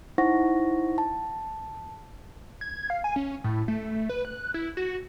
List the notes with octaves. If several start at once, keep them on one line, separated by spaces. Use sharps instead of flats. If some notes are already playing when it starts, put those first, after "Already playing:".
D#4 E4 C5 F#5 C#6 A#6
A5
G#6
F5
G#5
C#4
A2
A3
B4
F#6
E4
F#4